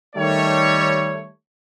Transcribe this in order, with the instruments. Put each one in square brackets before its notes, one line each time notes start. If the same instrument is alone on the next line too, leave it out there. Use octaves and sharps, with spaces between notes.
[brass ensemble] D#3 G3 A3 C#5